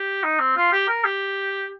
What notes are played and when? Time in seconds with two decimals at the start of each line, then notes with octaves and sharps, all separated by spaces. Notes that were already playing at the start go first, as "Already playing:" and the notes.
Already playing: G4
0.24 D#4
0.39 C4
0.57 F4
0.72 G4
0.88 A#4
1.04 G4